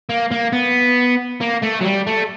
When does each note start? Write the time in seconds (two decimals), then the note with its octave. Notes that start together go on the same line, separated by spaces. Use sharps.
0.10 A#3
0.31 A#3
0.52 B3
1.41 A#3
1.63 A3
1.81 F#3
1.85 G3
2.07 A3